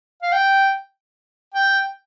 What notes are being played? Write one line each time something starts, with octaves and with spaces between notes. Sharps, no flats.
F5
G5
G5